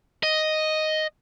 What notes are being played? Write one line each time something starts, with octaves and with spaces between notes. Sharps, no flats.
D#5